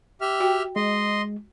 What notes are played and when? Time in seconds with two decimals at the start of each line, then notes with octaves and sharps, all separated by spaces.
0.21 G4 E5 F6
0.40 F#4 G5
0.76 G#3 D#5 C6